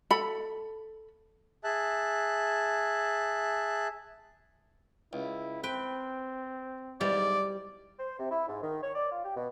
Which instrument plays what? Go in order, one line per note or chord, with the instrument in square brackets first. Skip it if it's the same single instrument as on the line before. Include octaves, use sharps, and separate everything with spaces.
[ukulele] A4 B5
[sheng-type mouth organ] G#4 E5 A5 F#6
[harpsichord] C#2 [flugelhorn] E4
[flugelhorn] C4 [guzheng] B4 [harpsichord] G5
[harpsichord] B1 E2 G#2 [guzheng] G3 [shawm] D5
[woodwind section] C5
C3
E4
G#2
D#3
C#5
D5
F4
G4
B2